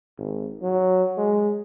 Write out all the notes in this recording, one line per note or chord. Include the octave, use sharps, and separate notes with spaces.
G#1
F#3
G#3